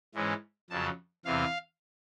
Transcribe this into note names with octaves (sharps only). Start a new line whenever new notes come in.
G#2 E3 G#3 C#4
F2 C#3 F#3 A5
E2 C3 E3 F5